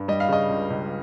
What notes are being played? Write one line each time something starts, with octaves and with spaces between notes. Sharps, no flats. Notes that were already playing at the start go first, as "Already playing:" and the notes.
Already playing: G2
G3 D#5
F5
C#3 D#5
C#2
C#2